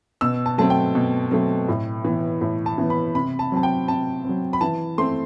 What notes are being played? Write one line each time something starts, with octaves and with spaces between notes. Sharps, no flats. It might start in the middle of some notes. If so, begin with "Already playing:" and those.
B2 E6
A5
F#3 A3 C4 A5
G5
B2
F#3 A3 C4
A2
E3 B3
A2
A5
E3 B3
B5
C3 B5
A5
F#3 C4 A5
G5
C3 A5
F#3 C4
B5
E3 A5
A3 C4 C6